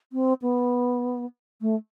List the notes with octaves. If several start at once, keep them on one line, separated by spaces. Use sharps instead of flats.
C4
B3
A3